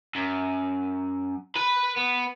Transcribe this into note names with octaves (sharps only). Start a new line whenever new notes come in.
F#2
B4 B5
B3